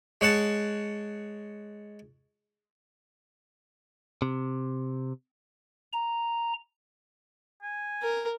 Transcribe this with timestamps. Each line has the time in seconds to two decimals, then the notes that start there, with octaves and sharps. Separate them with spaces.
0.21 G#3 C#5 F#5 A5
4.22 C3
5.93 A#5
7.63 G#5
8.03 A#4